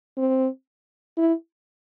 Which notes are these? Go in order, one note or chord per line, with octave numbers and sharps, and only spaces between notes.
C4
E4